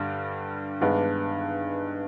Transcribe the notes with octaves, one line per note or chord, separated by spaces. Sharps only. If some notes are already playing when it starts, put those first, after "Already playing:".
Already playing: G2 D3 G3
G2 D#3 G#3 B3 D4